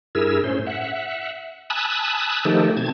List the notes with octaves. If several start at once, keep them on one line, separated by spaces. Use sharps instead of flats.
G2 E4 G#4 A#4 E6
A2 C#4 C5
E5 F#5
G#5 A5 B5 D#6 E6 F#6
D#3 F3 A3 D#4 G4 A4
B2 C4 A5 G#6